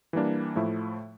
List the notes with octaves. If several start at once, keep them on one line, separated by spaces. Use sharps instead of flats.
E3 G3 A#3 D4
A2 F3 A3 E4